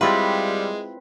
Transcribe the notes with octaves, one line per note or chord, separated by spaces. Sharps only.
G3 G#3 C4 E4 F4 B4